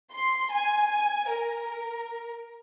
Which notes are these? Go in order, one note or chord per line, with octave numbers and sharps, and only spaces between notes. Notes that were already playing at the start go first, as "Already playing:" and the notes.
C6
G#5
A#4